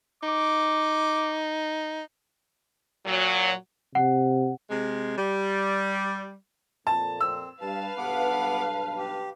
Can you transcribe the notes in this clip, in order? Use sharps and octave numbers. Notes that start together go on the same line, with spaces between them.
D#4 D6
A#2 F#3
C3 F#5
C3 G#3
G3
F2 A#2 A5
C4 E6
G2 B4 F5 A5
B1 G2 B3 F#5 A5 D6
G4